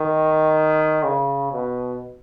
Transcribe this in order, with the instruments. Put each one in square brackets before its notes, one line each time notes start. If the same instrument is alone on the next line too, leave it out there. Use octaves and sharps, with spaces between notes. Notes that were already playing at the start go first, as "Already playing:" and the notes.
Already playing: [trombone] D#3
C#3
B2